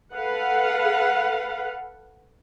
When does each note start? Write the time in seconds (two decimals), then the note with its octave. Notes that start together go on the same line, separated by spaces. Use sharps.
0.14 A4 B4 F5 F#5